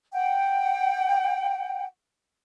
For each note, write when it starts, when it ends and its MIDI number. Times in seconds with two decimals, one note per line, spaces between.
0.12 1.84 78
0.12 1.84 79